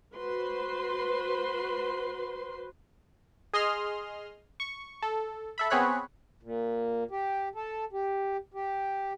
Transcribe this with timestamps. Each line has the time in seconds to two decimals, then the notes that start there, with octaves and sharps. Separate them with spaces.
0.15 F#4 B4 C5 C6
3.54 G#4 D#5 C6 D#6 F6
4.60 C#6
5.02 A4
5.58 A4 E5 B5
5.70 B3 C4 G#4 C#5 B5 F#6
6.43 A#2
7.11 G4
7.55 A4
7.93 G4
8.54 G4